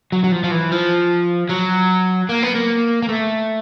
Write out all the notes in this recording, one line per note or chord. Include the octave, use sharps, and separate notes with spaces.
F#3
F#3
F3
F3
E3
F3
F#3
A#3
B3
A#3
A#3
A3